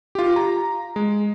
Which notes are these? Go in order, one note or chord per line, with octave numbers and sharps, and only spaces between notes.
F4 G4
A#5
G#3